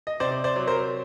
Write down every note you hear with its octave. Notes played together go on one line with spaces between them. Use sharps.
D#5
C3 C5 D5
C5 D5
F#3
A#4 C5